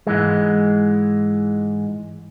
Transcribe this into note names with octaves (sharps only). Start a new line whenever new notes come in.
G#2 E3 G#3